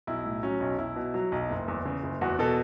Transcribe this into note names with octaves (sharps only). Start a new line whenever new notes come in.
B1 E4
A2
F#3 C#4
B1
B1 E4
B2
F#3
B1
F#1
E2
C#3
F#1
E2 F#4
B2 A4